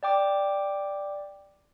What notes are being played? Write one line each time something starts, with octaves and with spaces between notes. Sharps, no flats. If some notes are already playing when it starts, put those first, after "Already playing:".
D5 G5 D6